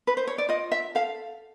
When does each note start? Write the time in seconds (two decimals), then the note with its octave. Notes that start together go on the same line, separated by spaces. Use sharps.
0.07 B4
0.17 C5
0.27 C#5
0.38 D5
0.49 F4 D#5
0.72 E5
0.95 A4 F5